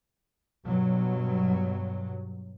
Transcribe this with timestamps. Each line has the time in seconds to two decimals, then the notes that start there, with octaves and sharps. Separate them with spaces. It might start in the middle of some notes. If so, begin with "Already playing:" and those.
0.66 G2 B2 F#3